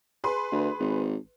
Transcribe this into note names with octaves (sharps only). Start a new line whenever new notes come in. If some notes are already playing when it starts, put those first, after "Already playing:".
G#4 B4 C6
D2
G#1